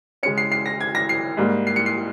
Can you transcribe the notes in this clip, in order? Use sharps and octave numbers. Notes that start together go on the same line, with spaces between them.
C#3 G#3 C#4 C#7
C7
C7
A#6
G#6
A#6
C7
G#2 G3 A#3
C7
C#7
C7